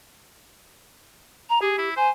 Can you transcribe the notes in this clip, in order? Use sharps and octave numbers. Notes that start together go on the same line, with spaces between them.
A#5
G4 G#4
E4
C5 G#5